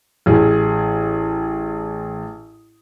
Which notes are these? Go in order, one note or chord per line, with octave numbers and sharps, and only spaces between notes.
A1 G#4